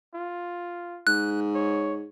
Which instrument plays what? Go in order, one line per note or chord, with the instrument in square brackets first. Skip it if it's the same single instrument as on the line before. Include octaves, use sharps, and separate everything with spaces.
[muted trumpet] F4
[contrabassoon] G#2 [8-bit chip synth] F#6
[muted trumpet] C#5